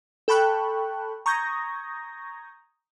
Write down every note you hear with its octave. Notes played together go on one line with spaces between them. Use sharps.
A4 G5 A5 B5 C#6 F#6
A#5 C#6 D#6 G6 G#6 A#6